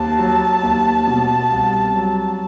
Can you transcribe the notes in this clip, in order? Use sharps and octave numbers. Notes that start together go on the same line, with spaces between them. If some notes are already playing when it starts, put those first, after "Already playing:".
Already playing: D#2 A5
F#3
D#2
B2
C2
F#3